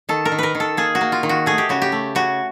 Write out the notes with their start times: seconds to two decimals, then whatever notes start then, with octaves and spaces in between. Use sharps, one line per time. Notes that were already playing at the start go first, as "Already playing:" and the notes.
0.09 D#3 A4
0.25 A#4
0.32 D#3
0.38 A#4 B4
0.55 D#3
0.60 A4
0.77 A#3 G#4
0.95 F#4
1.01 A#3
1.12 F4
1.23 D#3
1.29 F#4
1.46 A3 G#4
1.58 G4
1.69 C#3 F#4
1.82 G4
1.92 A3
2.15 C#3 F#4